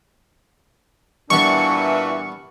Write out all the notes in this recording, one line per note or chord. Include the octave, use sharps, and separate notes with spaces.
A#2 E3 G3 B3 D4 C#6